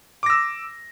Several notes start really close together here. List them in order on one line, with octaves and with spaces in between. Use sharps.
D6 A#6 E6